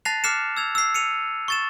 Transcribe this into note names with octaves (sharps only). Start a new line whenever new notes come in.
A5 F#6 A6 A#6 C7 F7
D6 F6 F#6 C7 C#7 E7
E6 G#6 F7
E6 C7
C#7 D#7 F7
C#6 A6 E7